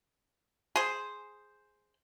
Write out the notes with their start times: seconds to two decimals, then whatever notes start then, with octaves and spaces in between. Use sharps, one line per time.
0.76 G#4 C5